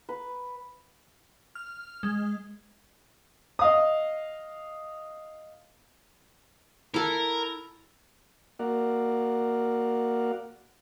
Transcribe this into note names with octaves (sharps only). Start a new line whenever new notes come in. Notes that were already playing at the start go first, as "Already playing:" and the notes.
B4
F6
G#3
D#5 F5 D#6
E4 A4 A#4
A#3 F#4 A#4 D5 F5 F#5